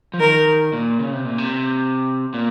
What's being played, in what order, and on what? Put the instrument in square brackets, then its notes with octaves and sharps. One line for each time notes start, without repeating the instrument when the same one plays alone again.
[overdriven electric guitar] F3
[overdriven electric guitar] D#3 [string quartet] A#4
[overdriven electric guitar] A#2
C#3
C3
A#2
C3
A#2